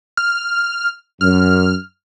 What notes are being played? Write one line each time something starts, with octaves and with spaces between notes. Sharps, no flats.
F6
F#2 F6